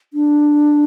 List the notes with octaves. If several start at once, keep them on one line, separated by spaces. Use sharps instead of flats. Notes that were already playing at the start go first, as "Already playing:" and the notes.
D4